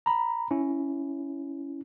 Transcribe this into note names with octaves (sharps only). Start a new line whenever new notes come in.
A#5 B5
C#4 E4